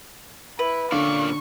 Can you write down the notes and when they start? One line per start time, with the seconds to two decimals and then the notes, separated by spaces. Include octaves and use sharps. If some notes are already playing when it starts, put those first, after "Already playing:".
0.59 E4 B4
0.92 A#2 D3 C#4 D5 F5 C#6